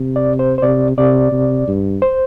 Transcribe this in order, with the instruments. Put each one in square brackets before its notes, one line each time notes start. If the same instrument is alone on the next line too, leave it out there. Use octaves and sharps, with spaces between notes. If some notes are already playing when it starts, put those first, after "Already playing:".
Already playing: [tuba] C3
[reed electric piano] D5
C5
C5
[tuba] C3 [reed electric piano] D5
[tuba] C3 [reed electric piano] D5
[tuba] C3
G2
[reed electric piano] C5